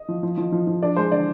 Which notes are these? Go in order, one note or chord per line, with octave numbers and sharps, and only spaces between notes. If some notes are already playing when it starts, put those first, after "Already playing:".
Already playing: D#5
F3
F3
F3
F3
F3
D4 D5
G#3 C5
D3 D5